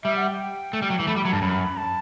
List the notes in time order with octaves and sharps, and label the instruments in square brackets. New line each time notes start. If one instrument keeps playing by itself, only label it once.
[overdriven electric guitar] G3 [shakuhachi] E5
[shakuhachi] F#5
G5
[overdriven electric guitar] A3
G3
F#3
E3
[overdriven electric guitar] A3 [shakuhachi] B5
[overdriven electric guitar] G3
[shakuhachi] B5
[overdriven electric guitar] F#3
[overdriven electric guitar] G2 [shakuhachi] A5
[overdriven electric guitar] F#2 [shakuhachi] B5
[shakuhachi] A5